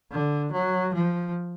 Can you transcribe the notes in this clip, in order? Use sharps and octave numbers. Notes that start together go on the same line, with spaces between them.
D3
F#3
F3